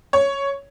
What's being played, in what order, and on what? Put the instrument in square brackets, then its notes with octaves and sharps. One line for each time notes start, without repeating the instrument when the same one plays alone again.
[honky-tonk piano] C#5